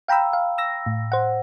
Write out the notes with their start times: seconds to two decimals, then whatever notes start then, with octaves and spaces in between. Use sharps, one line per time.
0.08 F5 G5 A#5 B5 E6
0.33 F5
0.58 E6 A#6
0.86 A2
1.12 C5 F#5